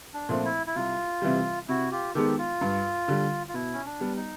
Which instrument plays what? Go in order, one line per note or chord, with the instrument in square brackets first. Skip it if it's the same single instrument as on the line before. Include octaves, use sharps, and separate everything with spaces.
[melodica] D4
[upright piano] A#2 F3 A3 C4
[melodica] E4
E4
[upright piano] C2 [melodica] F4
[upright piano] C3 E3 G3
[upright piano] C3 [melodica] E4 F#4
[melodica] F4 G4
[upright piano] D#3 G#3 B3 [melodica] G4 A4
[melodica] F4
[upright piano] G2
D3 G3
[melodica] F4
[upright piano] B2 [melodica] E4
[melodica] C#4
D4
[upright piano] G3 B3
[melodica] D#4